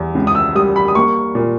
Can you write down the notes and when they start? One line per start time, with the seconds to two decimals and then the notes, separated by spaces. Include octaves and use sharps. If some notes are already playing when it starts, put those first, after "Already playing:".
Already playing: E2 G3
0.15 C#2
0.27 D#6
0.35 E6
0.55 G3 D#6
0.76 B5
0.88 D#6
0.95 A#3 C#6
1.35 A#2